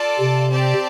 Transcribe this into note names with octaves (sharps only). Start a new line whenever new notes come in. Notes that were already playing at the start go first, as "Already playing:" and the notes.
Already playing: F4 A4 D5 A5
C3
C4 G4 D5 A5